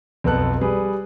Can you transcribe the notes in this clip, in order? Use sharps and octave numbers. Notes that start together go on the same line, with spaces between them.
B1 F2 B3 A4 F#6
G3 G#4 B4